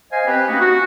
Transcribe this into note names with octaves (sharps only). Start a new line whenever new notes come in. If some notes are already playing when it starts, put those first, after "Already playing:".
C5 D#5 F5 G#5
C4 G4 B4
A3 A#3 C#4 D#4 F#4
F#4